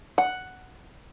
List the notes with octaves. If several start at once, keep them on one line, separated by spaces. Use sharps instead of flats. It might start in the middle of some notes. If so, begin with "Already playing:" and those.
F#5